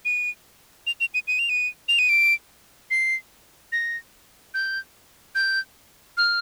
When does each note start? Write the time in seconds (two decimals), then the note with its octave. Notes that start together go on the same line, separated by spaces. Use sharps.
0.05 D#7
0.87 F7
1.00 F7
1.14 D#7
1.28 D#7
1.39 F7
1.49 D#7
1.88 F7
1.99 D#7
2.09 D7
2.91 C7
3.72 A#6
4.54 G6
5.35 G6
6.17 F6